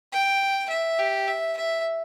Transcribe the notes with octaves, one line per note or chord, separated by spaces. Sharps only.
G5
E5
G4
E5
E5